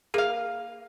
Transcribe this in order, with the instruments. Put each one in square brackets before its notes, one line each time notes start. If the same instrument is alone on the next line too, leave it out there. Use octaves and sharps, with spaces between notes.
[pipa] A#3 F5 [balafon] G#4